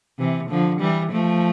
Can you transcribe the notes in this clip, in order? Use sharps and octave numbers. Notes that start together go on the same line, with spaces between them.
C3 E3
D3 F3
E3 G3
F3 A3